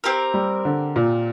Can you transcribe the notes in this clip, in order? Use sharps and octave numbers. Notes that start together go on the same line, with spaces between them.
C4 G4 A#4
G3
D3
A#2